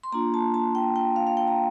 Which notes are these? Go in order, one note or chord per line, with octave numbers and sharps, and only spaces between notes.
C6
A#3 D4 F4 A#5
A5
A5
G5
G5
F5
F5
G5
A#5